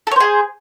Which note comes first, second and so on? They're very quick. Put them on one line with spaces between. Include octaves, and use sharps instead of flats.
A4 C#5 C5 G#4